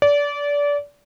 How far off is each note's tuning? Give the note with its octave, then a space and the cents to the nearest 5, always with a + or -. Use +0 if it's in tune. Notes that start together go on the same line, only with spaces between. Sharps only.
D5 -25